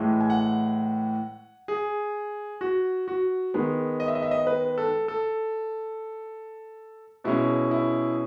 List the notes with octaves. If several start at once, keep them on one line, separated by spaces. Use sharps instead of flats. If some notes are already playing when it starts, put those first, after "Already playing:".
Already playing: A2 E3 G#3
G#5
F#5
G#4
F#4
F#4
D#3 G#3 B3
D#5
E5
D#5
E5
D#5
B4
A4
A4
B2 G#3 C#4 E4
E4